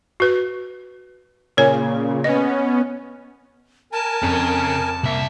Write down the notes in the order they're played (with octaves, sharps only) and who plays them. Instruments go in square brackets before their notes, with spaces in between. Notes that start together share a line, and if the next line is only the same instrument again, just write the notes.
[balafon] F#4 B4
[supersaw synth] A#2 C#3 [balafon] A#4 C#5 G#5
[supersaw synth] B3 C#4 [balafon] D#5
[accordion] A#4 G#5 [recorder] A5
[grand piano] F2 [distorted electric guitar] C#3
[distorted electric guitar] C2 E5 [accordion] A#3